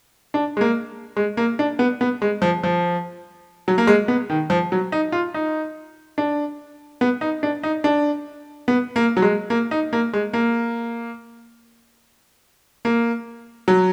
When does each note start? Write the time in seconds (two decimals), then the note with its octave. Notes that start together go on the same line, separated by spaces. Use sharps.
0.34 D4
0.57 G#3
0.61 A#3
1.17 G#3
1.37 A#3
1.59 D4
1.79 B3
2.01 B3
2.22 G#3
2.42 F3
2.64 F3
3.68 F#3
3.78 A#3
3.87 G#3
4.08 B3
4.30 D#3
4.50 F3
4.72 F#3
4.92 D#4
5.12 F4
5.34 D#4
6.18 D4
7.01 B3
7.21 D#4
7.43 D4
7.63 D#4
7.84 D4
8.68 B3
8.96 A#3
9.17 F#3
9.22 G#3
9.50 A#3
9.71 D#4
9.93 A#3
10.13 G#3
10.33 A#3
12.85 A#3
13.68 F#3